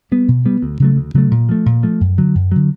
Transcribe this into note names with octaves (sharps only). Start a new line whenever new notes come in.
G3 B3
B2
G3 B3
D2
C#3 F#3 A3
D2
C#3 F#3 A3
A#2
F3 A3
A#2
F3 A3
F#2
D3 F#3
F#2
D3 F#3